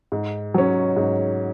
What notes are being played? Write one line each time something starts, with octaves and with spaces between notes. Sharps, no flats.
G#2
F#3 C#4
G#2